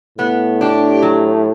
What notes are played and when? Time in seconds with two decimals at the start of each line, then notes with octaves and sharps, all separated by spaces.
0.18 A2 B3
0.61 D4 G4
1.02 F#3